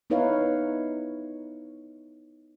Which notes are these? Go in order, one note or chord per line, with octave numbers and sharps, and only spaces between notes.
B3 D#4 E4 B4 C#5 F5